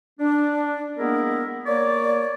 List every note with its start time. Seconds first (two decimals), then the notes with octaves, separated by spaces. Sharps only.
0.20 D4
0.98 G#3 A#3 B3 E4 A#4
1.67 A#3 C#5 D5